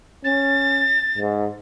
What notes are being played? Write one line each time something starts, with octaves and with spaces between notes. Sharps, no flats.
C#4 A6
G#2